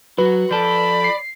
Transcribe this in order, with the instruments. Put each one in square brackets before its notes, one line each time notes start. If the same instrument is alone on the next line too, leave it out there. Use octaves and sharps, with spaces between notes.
[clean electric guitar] F#3 [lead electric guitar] F#4 [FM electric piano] B4
[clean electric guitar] F3 A4 [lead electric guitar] D5 [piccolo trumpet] B5
[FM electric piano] C7